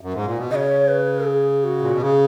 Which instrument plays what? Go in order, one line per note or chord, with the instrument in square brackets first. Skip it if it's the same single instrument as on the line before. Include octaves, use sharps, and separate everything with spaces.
[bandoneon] F#2
G#2
A#2
B2
[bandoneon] C#3 [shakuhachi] D#5
[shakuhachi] C#5
B4
G#4
F#4
[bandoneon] A#2
B2
[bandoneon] C#3 [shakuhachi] G#4